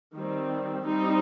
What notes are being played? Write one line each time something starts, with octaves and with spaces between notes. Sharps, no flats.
D#3 G3 C4
G3 C4 D#4